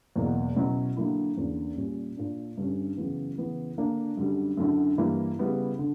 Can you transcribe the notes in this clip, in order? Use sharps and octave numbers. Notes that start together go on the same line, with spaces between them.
E2 B2 F#3 A#3
B2 F#3 C#4 E4
D3 F#3 A#3 E4
E2 D3 A#3 C#4
A#2 G3 C#4
A#2 A#3 D4
G2 D3 G3 C#4
F#2 C#3 E3 B3
C#3 E3 B3
D3 A#3 D4
F#2 D3 G3
F#2 D3 F#3 C#4 E4
G2 E3 G3 A#3 E4
C#3 G3 B3 E4
D3